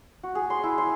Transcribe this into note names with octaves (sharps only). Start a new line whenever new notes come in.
F#4
G#4
C6
E4
C6